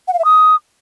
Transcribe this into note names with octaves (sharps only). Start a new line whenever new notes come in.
F#5
F5
E5
D#6